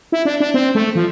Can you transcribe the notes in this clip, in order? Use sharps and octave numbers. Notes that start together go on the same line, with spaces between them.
E4
D4
D4
C4
A3
F3